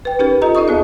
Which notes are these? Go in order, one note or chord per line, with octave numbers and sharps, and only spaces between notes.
B4 G5
C#4 D#4 G4 A#4 B4
F4 A4 D#5 A#5
D#4 D5 D#5 C#6 D#6
D#2 B3 G#4 D#5